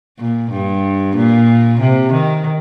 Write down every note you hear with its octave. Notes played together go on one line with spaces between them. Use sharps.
A#2
G2
A#2
C3
D#3